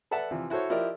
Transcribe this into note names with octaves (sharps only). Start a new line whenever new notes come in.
A4 B4 D5 E5 F#5 A5
C3 E3 F3
E4 F#4 A4 C5 C#5
F3 E4 G4 A#4 D5 D#5